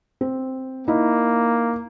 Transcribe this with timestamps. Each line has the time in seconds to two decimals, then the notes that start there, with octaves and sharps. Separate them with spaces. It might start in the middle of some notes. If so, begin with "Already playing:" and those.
0.21 C4
0.88 A#3 D#4 E4